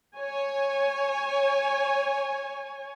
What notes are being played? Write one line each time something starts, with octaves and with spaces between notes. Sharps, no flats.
C#5 G#5